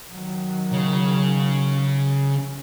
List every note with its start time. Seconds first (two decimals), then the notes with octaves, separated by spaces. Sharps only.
0.13 D#3 F#3
0.73 C#3